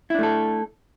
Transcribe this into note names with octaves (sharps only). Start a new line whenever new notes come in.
A3 D4 E4 A4